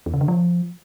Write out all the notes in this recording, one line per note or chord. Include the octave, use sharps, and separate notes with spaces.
E2
C#3
D3
F3